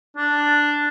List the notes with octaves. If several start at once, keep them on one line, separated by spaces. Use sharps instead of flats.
D4